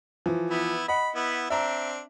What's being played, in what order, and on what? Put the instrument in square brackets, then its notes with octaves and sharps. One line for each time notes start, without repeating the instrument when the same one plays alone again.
[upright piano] E3 F3
[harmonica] B3 E4
[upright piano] D#5 F#5 [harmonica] B5
[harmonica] B3 E4
[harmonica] C4 D4 [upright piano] E5 A#5